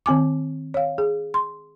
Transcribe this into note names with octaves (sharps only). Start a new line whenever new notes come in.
D#3 C4 G#5 D6
C#5 F5
G#4
C6